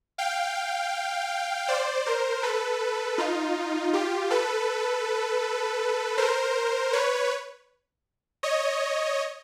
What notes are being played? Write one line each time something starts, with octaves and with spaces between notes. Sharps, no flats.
F5 G5
C5 D5
A#4 C5
A4 B4
D#4 F4
F4 G4
A4 B4
A#4 C5
B4 C#5
C#5 D#5